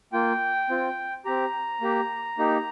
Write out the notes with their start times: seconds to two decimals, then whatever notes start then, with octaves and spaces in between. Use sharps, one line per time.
0.12 A#3 F4 G5
0.69 C4 F4
1.25 C4 G4 A#5
1.81 A#3 G4
2.38 A#3 D#4 G4